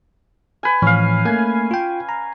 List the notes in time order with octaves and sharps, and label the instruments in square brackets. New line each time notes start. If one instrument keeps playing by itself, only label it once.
[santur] B4 G#5
[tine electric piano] A2 E3 F3 [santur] C#4 F5
[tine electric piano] A3 A#3 [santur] G#5
[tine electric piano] F4 G5
A#5